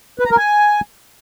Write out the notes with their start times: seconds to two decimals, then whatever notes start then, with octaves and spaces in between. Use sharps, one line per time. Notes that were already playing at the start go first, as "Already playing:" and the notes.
0.19 B4
0.25 A#5
0.31 A#4
0.37 G#5